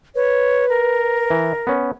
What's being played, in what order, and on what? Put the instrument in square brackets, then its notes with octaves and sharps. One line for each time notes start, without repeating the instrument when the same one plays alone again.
[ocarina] B4 [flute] C#5
[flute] A#4
[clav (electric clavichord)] E3
B3 C#4